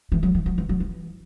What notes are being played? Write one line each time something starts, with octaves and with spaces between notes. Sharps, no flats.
E3
F#3
E3
F#3
E3
F#3
E3